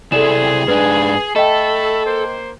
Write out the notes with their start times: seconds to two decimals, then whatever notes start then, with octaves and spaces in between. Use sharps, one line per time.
0.12 C3 E4 G#4 A4 D5 E7
0.68 G#2 D4 B4
1.36 A3 A4 D#5 E5 G5 B5
2.06 A#3 C5